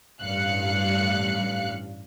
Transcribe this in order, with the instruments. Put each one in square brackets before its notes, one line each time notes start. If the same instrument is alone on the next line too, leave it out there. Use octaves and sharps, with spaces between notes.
[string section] A1 G2 F5 F#6 C#7